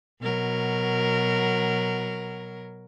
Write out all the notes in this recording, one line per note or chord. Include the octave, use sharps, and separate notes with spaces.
B2 F#3 A#4